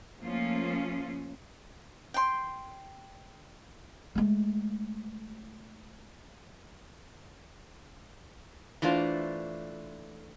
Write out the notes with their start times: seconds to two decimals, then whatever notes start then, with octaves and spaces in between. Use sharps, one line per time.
0.22 F3 A3 A#3 C#4 F4
2.14 G5 C6
4.15 G#3 A3
8.82 E3 A3 D4 F4 C5